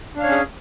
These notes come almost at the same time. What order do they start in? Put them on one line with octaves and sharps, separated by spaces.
D4 F5 C#5 C#4 G#4